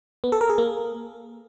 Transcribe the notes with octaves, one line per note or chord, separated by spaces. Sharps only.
B3
A4
A#4
G#4
A#3